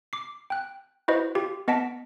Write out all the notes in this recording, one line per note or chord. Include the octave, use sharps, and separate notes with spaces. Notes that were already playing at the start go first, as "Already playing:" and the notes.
D6 C7
G5 F#6
E4 F#4 B4 C5 D#5
F4 G4
B3 D#5 F#5 A5 B6 D7